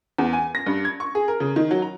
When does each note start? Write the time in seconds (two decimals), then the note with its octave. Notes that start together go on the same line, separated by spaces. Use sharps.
0.18 E2
0.33 G#5
0.55 A#6
0.66 G2
0.85 G#6
1.00 C#6
1.15 G#4
1.28 A#4
1.40 C#3
1.56 D#3
1.71 F#3
1.82 A#5